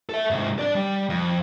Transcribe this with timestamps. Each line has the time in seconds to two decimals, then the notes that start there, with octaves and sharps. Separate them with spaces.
0.09 A4 E5
0.30 G#2 C3
0.59 D4 D5
0.75 G3
1.10 F2